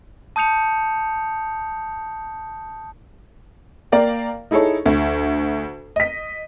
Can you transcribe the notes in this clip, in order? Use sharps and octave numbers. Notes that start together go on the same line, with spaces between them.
A5 D#6 G6 C#7 F7
A#3 A#4 D5 F5 G5
D#4 E4 G#4 A4 C#5
D2
D#5 B6